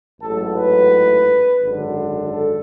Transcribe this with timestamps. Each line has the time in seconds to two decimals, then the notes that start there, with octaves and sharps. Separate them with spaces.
0.20 A1 G#2 F#3 A4
0.56 B4
1.60 G#1 F#2 D3
2.29 A4